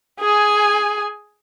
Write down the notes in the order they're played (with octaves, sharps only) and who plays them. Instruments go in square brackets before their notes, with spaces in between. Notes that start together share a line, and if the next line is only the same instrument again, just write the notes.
[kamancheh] G#4 G#5